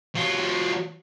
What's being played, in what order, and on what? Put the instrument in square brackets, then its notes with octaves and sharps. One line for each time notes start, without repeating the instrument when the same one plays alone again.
[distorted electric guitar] F#3 F4